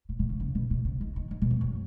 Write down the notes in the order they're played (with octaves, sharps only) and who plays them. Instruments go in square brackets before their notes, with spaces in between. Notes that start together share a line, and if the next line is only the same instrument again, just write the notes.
[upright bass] A2
B2
C#3
C#3
B2
B2
C#3
D#3
D#3
D#3
B2
G#2
F#2